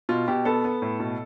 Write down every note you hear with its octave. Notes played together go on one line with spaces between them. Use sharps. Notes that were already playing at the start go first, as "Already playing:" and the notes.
B2 F4
B2 G4
B3 A4
B3
A2
B2